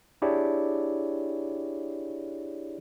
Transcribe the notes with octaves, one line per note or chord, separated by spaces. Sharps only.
D4 E4 G4 G#4 C#5 D5